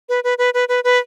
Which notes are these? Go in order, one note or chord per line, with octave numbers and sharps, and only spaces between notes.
B4
B4
B4
B4
B4
B4